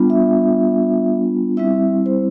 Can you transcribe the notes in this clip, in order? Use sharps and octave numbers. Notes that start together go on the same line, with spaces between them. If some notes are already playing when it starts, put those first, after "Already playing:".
Already playing: G3 B3 D4 F4
E5
G3 C4 E4 E5
C5